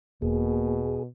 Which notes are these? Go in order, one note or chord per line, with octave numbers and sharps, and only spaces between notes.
E1 B2 A#3 G#4